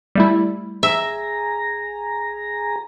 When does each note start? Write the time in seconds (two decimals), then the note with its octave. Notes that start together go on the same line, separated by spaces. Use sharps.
0.15 G3 A3 E4
0.83 G#4 E5 A#5